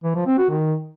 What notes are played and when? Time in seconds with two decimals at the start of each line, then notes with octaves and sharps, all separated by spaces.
0.04 E3
0.15 F3
0.26 C4
0.38 F#4
0.49 D#3